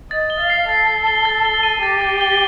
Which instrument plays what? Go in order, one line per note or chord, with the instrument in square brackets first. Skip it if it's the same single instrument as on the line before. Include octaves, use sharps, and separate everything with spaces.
[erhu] D#5 [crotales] A6
[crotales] G7
[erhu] F5
[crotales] C7
[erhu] A4 [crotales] A6
[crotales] A6
G7
A6
G7
D#7
[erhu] G4 [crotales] A6
[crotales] A6
G7